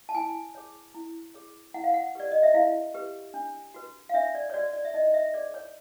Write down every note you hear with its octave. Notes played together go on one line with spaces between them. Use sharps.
A5
E4 G#5
G#4 C#5
E4
G#4 C#5
E4 F#5
F5
F#5
G4 B4 D5
D#5
E5
E4 F5
G4 B4
D4
F#4 B4
F5
D4 E5
D5
C#5
F#4 B4 D5
D5
E5
D#4 D#5
E5
G#4 C5 D5
C#5